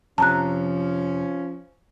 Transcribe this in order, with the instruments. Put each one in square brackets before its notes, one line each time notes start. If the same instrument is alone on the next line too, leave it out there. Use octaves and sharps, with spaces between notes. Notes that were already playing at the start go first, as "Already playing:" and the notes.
[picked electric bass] F2 C3 [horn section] F3 C#4 [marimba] A5 A#5 F#6